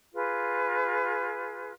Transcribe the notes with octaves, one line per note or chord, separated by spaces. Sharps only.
F4 G#4 B4